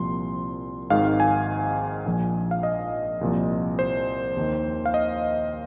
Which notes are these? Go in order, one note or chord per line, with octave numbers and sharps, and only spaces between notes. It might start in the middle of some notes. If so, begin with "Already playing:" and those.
Already playing: C2 A#2 F3 C6
G#1 G#2 D#3 F5
G#5
A#1 A#2 F3
F5
D#5
C2 A#2 F3
C5
D#2 D#3
F5
D#5